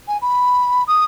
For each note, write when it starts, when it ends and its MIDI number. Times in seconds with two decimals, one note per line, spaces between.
0.08 0.18 80
0.22 0.84 83
0.87 1.05 87